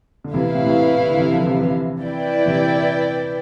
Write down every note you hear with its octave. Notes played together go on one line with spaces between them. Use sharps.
D3
C3 E3 E4 B4 F5
C3 E3
A2 C3
A2 C3
C3
D3
C3 E3
D3 F3
C3 E3
C3 E3
E4 B4 D5 G5
C3 E3